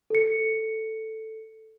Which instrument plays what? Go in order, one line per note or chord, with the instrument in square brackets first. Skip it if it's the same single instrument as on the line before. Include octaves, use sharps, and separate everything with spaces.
[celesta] A4 C#7